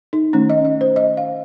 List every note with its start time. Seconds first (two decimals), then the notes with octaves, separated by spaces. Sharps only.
0.13 D#4
0.33 D#3 A3 C#4
0.50 D#5
0.65 D#5
0.81 C5
0.96 D#5
1.17 F5